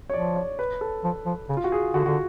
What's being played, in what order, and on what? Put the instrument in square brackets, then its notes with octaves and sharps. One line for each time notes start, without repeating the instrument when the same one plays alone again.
[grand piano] C#5
[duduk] F3 [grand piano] D5
[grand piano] C#5
B4
A4
[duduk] F3
F3
C#3
[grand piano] F4
F#4
G#4
[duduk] D3 [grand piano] F#4
[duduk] D3 [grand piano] F#4